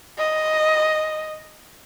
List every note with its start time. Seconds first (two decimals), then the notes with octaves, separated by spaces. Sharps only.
0.19 D#5